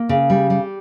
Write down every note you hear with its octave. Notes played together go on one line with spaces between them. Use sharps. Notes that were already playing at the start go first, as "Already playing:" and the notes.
Already playing: A#3
C#3
G3
G3